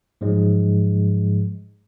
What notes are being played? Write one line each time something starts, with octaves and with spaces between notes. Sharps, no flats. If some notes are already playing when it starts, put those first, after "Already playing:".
G#2 F3 F#3 G#3